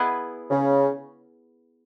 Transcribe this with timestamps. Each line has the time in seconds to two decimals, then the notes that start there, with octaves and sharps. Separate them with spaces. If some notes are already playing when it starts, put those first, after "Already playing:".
Already playing: B3 E4 G#4 B4
0.51 C#3